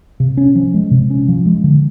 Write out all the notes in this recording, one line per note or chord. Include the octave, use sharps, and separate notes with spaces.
C3
C#4
F3
G#3
C3
C#4
F3
G#3
D3